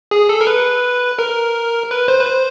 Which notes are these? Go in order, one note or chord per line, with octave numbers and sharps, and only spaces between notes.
G#4
A4
A#4
B4
A#4
B4
C5
B4
C5